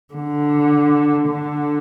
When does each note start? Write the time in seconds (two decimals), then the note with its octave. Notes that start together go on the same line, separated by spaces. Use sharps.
0.14 D3
1.28 D3